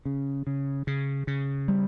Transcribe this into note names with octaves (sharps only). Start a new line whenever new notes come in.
C#3
C#3
C#3
C#3
G3